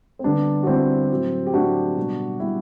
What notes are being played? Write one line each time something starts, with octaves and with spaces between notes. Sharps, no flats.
C4
D3 G3 B3 D4
F#4
D3 G3 C4 E4
A2 F#3 A3
G4
A2 F#3 A3 D4 F#4
B2 G3
B2 G3 E4 G4